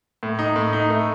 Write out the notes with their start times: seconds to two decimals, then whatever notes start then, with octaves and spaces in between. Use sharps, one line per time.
0.23 A2
0.39 D#4
0.56 A2
0.73 D#4
0.90 A3